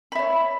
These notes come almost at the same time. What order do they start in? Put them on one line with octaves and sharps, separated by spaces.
B5 E5 C#5